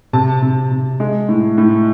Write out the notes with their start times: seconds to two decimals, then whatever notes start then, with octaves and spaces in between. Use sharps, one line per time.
0.13 C3 A5
0.42 C3
0.72 C3
1.00 G#3
1.29 A2
1.58 A2